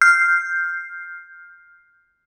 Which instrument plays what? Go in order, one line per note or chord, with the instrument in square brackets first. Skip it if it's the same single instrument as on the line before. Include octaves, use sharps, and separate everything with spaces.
[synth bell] F6 G6 C7